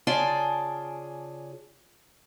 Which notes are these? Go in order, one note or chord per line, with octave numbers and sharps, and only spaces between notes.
C#3 F4 G#4 D5 A5